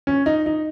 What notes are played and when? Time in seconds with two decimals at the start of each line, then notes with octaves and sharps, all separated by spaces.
0.07 C#4
0.26 D#4
0.46 D#4